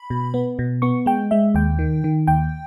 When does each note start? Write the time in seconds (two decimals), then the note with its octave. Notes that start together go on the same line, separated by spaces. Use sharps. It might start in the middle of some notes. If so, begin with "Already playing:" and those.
Already playing: B5
0.10 B2
0.34 B3
0.59 B2
0.82 B3 C#6
1.06 G#3 G5
1.31 G#3 E5
1.55 D#2 G5
1.79 D#3
2.04 D#3
2.27 D#2 G5